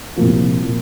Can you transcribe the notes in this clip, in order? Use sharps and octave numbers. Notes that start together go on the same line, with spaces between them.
C2 A#2 F3 A#3
A#2 F3 A#3